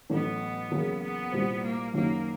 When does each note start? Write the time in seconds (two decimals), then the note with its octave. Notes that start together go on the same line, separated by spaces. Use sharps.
0.09 A1 A2 F#3 B3
0.71 E2 C#3 F#3 A#3
1.01 B3
1.32 C2 A#2 G3 C4
1.62 A#3
1.94 F#1 F#2 D#3 F#3 A#3